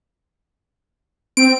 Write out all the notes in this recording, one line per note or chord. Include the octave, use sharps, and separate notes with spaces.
C4 D7